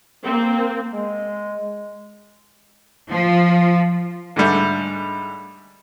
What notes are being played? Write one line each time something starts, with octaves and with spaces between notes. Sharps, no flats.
A#3 C4
G#3
F3
G#2 D3 G3 A3